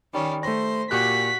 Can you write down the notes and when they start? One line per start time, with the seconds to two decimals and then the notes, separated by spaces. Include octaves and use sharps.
0.13 D#3 G3 C#4
0.43 A3 C5 A#6
0.91 A#2 F#4 G4 F#6 B6